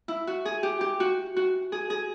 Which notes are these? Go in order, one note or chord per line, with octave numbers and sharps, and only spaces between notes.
E4
F#4
G#4
G4
G4
F#4
F#4
G#4
G#4